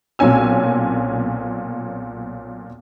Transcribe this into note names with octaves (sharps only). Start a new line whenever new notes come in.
B1 A#2 C4 C#4 G#5 E6